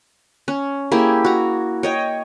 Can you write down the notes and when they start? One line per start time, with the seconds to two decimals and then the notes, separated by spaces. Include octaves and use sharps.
0.48 C#4
0.91 A#3 E4 G4 G#4
1.24 F#4 A#5
1.83 C#5 D#5 G5